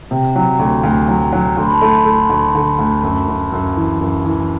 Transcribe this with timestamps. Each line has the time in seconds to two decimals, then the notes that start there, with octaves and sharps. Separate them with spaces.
0.11 C3 G5
0.36 F#3
0.59 D2
0.83 D2
1.08 F#3
1.33 F#3
1.57 D2 C6
1.64 B5
1.72 A5
1.78 A3 B5
2.05 A3
2.29 D2
2.55 D3
2.79 D2
3.04 F#2
3.28 F#2
3.52 F#2
3.76 E3
4.01 F#2
4.25 E3